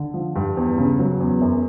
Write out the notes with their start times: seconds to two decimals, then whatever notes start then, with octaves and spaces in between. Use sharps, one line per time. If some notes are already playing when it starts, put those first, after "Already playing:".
Already playing: D3
0.14 F3
0.36 G2
0.57 E2
0.78 C#3
0.99 F#3
1.20 E2
1.41 F#2